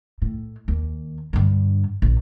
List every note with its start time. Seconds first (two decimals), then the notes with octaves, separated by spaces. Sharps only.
0.22 A2
0.68 D#2
1.33 G2 D3
2.02 A#1